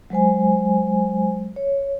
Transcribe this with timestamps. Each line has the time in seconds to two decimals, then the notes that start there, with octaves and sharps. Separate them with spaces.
0.10 F#3 G#3 C5 G#5
1.56 C#5